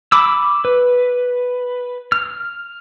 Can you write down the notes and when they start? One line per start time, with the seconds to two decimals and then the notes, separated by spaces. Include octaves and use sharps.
0.12 B5 D6 E6
0.65 B4
2.12 F6